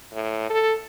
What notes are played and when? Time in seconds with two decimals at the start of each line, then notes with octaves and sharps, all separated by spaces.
0.13 A2
0.50 A4